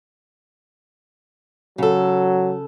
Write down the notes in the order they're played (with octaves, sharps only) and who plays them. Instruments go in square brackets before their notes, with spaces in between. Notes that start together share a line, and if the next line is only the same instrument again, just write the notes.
[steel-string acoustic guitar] C#3 A4 [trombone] F#3